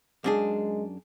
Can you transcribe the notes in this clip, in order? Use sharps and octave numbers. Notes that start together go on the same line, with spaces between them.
F#2 G#3 D4 G#4